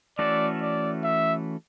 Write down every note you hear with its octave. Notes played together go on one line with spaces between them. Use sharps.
E3 A3 C#4 F#4 A4 D5
D5
E5